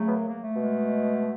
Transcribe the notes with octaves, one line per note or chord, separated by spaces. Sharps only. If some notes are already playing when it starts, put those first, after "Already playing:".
Already playing: C#3 F#3 A3
B3
A#3
A#3
A3
B2 G#3